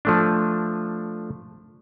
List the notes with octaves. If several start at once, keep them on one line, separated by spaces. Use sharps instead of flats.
F3 A3 D4